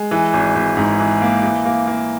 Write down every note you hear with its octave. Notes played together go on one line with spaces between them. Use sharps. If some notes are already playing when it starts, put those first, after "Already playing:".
Already playing: G#3
E3
G#1
G#1
G#2
E3
A#3
E3
A#3
A#3